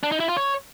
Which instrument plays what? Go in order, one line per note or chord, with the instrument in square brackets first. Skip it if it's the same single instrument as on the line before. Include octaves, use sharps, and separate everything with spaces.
[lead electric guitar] D4
D#4
E4
F4
C#5